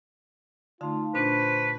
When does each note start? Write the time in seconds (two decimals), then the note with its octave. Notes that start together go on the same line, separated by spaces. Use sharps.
0.81 D3 A3 D#4 F4 F5 A5
1.15 A#2 D4 F4 B4 C5 A5 C#6